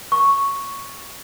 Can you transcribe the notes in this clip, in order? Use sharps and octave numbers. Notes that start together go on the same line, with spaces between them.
C#6